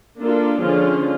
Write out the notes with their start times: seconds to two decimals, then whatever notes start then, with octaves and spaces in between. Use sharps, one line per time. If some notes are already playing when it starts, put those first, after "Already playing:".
0.20 A#3 D4 F4 A4
0.63 D3 F3 G#3 C#4 F4